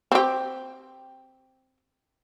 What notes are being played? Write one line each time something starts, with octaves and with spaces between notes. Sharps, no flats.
C4 G4